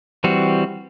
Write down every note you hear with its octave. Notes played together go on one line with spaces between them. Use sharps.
E3 G3 C4 F#4